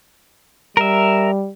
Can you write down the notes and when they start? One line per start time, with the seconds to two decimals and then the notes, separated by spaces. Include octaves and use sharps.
0.77 G3 A#4 E5